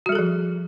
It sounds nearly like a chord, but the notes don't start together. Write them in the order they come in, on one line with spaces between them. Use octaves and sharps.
F#4 G3 A4 G#4 F3